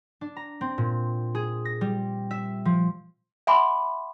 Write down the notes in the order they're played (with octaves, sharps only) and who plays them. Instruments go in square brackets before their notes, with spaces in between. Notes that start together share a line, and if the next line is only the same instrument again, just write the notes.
[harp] D4
A#5
C4
A#2
G#4
A#6
G3
E5
F3
[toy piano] E5 F#5 G#5 B5 C6 D6